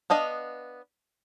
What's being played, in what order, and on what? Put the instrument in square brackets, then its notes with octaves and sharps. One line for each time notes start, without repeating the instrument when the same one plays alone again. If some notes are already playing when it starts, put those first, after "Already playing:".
[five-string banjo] B3 D4 D#5 F5